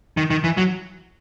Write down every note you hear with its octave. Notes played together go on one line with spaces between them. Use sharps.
D#3
D#3
E3
F#3